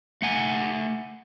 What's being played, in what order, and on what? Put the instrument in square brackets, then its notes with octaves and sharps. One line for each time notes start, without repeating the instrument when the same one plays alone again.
[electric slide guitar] A3 F#5 G#5